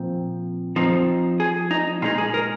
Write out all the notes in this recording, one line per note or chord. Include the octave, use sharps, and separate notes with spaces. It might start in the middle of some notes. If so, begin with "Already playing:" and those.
Already playing: A#2 F3 C4
F3 C4 D#4
G#4
D#4
A#2 G#3 D#4 F4
G#4
A#4